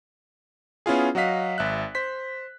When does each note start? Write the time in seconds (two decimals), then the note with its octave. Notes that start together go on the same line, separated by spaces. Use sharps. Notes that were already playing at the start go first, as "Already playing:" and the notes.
0.86 B3 C#4 E4 F4 G#4
1.15 F#3 F#4 D#5 F5 B6
1.58 G#1 E5 F#6
1.95 C5 B6